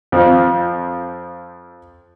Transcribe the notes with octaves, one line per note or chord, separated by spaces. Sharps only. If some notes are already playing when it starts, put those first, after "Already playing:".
F2 F3